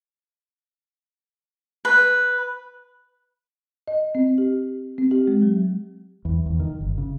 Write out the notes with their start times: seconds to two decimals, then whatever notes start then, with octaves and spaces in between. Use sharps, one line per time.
1.85 B4
3.88 D#5
4.15 C4
4.38 G4
4.98 C4
5.11 G4
5.28 G#3
5.42 F#3
6.25 E2
6.46 E2
6.60 D#3
6.81 G1
6.98 C#3